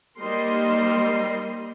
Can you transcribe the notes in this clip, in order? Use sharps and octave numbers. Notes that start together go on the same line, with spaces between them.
G3 A#3 D#4 A#4 C5 C6